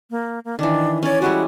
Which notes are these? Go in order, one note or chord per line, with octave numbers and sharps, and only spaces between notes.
A#3
A#3
D#3 E3 D4
C#4 C#5 D5
G3 G#3 E4 F#4